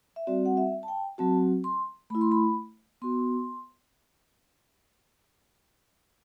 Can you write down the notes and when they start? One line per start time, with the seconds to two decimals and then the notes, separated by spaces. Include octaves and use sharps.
0.16 E5
0.27 G3 C4 F#4 D5
0.46 F#5
0.57 E5
0.83 A5
0.88 G5
1.18 F#3 C4 F#4 A5
1.64 C6
2.10 A3 E4 B5
2.21 C6
2.32 B5
3.02 B3 F#4 C6